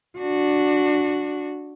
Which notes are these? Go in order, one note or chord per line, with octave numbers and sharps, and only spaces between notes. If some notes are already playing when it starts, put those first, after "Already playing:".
D4 F#4